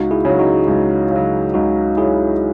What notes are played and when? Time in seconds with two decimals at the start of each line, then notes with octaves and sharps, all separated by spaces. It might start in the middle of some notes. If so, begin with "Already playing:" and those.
Already playing: C#2 D#4 F#4
0.11 E4 G#4
0.25 C#3 F#3
0.39 D#4 F#4
0.68 C#2
1.11 C#3 F#3
1.54 C#2 D#4 F#4
1.97 C#3 F#3 E4 G#4